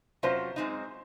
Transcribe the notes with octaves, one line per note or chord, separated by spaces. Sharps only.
C3 F#3 C#4 F4 C5
F#2 C#3 G#3 C4 D#4